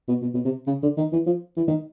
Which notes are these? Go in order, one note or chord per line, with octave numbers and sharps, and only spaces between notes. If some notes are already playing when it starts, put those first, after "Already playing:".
B2
B2
B2
C3
C#3
D3
D#3
E3
F3
E3
D#3